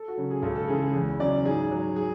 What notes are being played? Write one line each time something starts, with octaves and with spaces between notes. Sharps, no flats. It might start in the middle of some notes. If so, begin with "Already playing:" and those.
Already playing: A4
F#4
C#3 F#3
G#4
C#2 A4
A4
C#3 E3 G#4
G#4
E2
C#3 F#3 D5
G#2 G#4
F#3
G#4